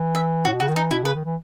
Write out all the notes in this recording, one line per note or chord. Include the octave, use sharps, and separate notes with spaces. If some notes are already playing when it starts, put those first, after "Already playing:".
Already playing: E3
E5
A2 F#4
B2
C#3 F#4
D#3
E3 D#4
B2 E4
C#3 B4
D#3
E3